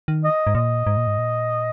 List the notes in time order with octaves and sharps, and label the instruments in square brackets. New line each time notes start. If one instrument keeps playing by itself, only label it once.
[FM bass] D#3
[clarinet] D#5
[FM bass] G#2
[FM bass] A#2 [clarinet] D#5
[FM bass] G#2
A#2
G#2
A#2